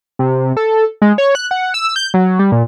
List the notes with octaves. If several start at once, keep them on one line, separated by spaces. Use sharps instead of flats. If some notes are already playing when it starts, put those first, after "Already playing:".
C3
A4
G#3
C#5
F#6
F#5
E6
G6
F#3
G3
A#2